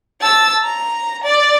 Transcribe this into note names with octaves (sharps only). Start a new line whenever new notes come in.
A5 E6
A#5
D5